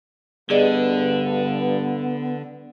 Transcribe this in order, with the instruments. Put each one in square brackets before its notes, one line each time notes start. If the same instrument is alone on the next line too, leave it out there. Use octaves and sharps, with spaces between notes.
[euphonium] G2 [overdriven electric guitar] D3 [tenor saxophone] B3 [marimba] G#4 D5 D#5